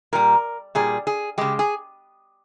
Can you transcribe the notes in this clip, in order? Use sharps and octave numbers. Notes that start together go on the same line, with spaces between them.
A#2 G3 A#4
A#2 G3 G#4
G#4
C#3 G#3 G4
G#4